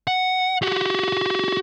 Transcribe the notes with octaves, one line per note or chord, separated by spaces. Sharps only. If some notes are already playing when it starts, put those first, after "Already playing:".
F#5
F#4 G4